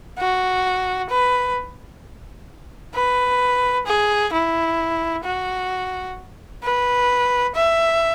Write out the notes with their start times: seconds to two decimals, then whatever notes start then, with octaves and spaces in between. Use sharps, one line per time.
0.19 F#4
1.09 B4
2.94 B4
3.86 G#4
4.33 E4
5.24 F#4
6.63 B4
7.56 E5